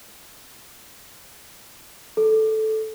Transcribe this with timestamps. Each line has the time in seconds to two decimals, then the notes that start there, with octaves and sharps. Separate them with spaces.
2.17 A4